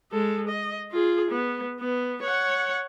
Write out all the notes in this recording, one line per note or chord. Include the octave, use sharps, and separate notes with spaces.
G#3 A4
D#5
F4 G#4
B3
B3
C#5 F#5